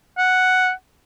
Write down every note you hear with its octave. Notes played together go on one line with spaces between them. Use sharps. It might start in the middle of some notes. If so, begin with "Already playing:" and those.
F#5